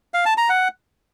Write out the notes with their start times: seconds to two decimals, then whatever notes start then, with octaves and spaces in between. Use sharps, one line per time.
0.14 F5
0.26 A5
0.37 A#5
0.49 F#5